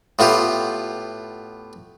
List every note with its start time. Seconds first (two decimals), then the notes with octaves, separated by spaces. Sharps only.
0.19 A2 B3 F4 G4